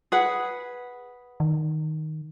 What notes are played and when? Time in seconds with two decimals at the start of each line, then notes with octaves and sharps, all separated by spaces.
0.12 G#4 B4 F#5
1.40 D#3